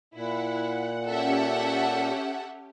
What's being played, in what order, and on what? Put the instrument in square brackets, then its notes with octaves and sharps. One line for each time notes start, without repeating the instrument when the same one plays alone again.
[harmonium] A#2 [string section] E4 [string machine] F#5
[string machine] C#4 G4 [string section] A4 E5 F#5